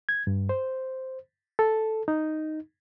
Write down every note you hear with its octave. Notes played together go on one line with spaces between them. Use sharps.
G#6
G2
C5
A4
D#4